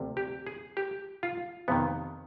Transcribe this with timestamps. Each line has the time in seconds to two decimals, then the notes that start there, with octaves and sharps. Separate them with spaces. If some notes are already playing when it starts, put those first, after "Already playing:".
Already playing: D2 C3 F3
0.17 G4
0.47 G#4
0.77 G4
1.23 F4
1.68 F2 C3 D#3 B3